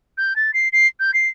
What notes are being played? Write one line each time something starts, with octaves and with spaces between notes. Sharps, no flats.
G6
A6
C7
C7
G6
C7